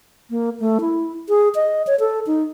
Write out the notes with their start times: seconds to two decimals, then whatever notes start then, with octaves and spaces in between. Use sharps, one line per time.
0.30 A#3
0.60 A3
0.81 E4
1.29 G#4
1.55 D#5
1.87 C#5
2.00 A4
2.27 D#4